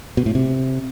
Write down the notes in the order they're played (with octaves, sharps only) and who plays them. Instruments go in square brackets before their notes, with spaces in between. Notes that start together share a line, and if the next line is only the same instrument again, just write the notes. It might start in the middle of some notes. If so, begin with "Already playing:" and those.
[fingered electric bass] B2
A2
C3